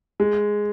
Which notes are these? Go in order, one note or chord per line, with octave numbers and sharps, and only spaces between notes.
G#3